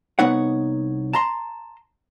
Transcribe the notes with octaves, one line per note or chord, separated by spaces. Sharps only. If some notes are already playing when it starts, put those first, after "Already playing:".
C2 B3 D#4 C#5 F#5
A5 A#5 C6